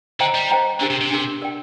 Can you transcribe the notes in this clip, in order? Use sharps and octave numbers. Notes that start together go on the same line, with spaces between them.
D3 C5 D#5 G5 A#5
G3
C5 D#5 G5 A#5
D3 D4 G4 A#4
C3
C3
D4 G4 A#4
A#4 D5 G5